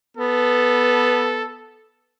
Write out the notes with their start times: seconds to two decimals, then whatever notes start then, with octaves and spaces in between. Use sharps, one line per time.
0.17 B3 A4